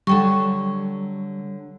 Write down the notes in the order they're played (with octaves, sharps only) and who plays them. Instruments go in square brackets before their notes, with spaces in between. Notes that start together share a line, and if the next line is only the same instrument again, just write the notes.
[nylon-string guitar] D3 F#3 A5 [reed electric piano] G3 [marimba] A4 G5 C#6